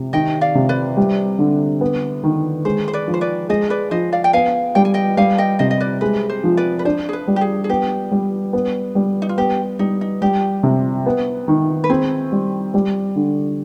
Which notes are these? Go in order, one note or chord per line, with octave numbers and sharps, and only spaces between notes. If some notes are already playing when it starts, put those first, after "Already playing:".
Already playing: C3
D#3 D#5 G5
D5 F5
C3
B4 D5
G3
D3
B3
D#3
G#3 C5
C5
B4 D5
F3
C5
B4 D5
G#3 C5 D#5
B4 D5
F3 C5 D#5
D5 F5
G5
B3 F5 G#5
G3 G5
G#5
D#5 G5
G3 F5 G#5
D#5 G5
C3 C5 D#5
D#5
B4 D5
G#3 B4
C5
F3
B4 D5
B4
D4 C5
G#4
B4
G3
G4
G#4
G#4
B3 G4
G3
B3
G3
D#4
F4
B3 G4
G3 D#4
D#4
G3 G4
C3
B3
D#3
B4
C4 G#4
G3
G3
D3